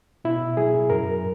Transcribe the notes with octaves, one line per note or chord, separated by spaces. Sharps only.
B2 E4
F#3 G#4
F#2 A#4